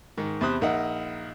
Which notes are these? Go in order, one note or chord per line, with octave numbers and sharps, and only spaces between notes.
G#2 D#3
E2 C3 C5 B5 D#6 F#6
A#1 D#4 A#4 E5 F#5